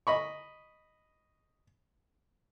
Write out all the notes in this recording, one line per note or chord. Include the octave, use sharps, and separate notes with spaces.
D#5 B5 C#6